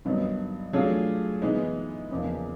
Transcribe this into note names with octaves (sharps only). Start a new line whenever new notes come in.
G2 D#3 F#3 B3 D#4
F#3 A3 D4 F4 G#4
E3 G#3 B3 D#4
E2 C#3 F3 A#3 D#4